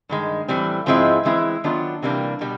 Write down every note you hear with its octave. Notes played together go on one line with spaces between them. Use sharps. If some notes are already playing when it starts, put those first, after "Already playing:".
G2 D#3 G#3
A2 E3 G3 C4
G#2 F3 G#3 C4 E4
E3 G#3 C4 E4
D#3 F#3 B3 D4 F4
C3 E3 G3 A#3 D4
B2 G3